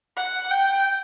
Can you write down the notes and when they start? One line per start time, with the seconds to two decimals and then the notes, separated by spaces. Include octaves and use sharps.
0.17 F#5
0.51 G5